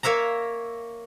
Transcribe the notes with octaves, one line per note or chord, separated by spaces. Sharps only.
A#3 C#5 E5 F5 A#5